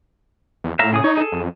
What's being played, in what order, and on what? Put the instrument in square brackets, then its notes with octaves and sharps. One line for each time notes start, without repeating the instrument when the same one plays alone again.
[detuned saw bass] E2
[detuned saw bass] A2 [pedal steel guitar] E5 F5 A#5
[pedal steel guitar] C#3 G#4 D#6
[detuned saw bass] D#4 [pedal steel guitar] C#5
[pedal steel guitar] G#4 A4
[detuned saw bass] F2